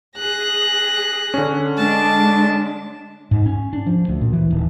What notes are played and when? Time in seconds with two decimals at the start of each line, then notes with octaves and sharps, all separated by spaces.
0.18 G#4 F#6 A#6
1.34 D3 C#4
1.78 G#3 D4 A5
3.31 G#2
3.46 C#4
3.73 D4
3.87 F3
4.08 D2
4.21 A#2
4.33 E3
4.51 D#1